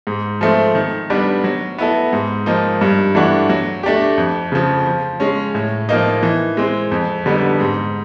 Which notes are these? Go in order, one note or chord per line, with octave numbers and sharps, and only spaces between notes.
G#2
F3 A3 C4
D#3
G3 B3 D4
F#3
B3 E4 A4
G#2
F3 A#3 D#4
G2
E3 A3 D4 F#4
F#3
A3 D4 G4
F2
C#3 F3
F3
G#3 C#4
A2
F3 A#3 D#4
E3
G#3 C4
F2
D3 G3 B3 D#4
G#2